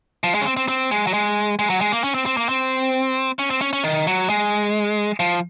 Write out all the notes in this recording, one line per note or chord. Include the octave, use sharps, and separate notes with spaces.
F3
G#3
C#4
C4
C4
C4
G#3
F#3
G#3
G#3
F#3
G#3
A#3
C#4
C4
C4
A#3
C4
C#4
C4
C#4
C#4
D#3
F#3
G#3
F3